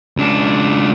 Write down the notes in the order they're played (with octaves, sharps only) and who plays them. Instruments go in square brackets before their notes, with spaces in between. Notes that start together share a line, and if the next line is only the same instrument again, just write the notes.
[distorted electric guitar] C#2 D4